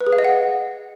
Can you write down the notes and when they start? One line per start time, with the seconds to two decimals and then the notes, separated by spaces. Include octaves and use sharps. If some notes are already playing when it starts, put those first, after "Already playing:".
0.01 B4
0.07 G#4
0.13 F5
0.19 D#5
0.24 F#5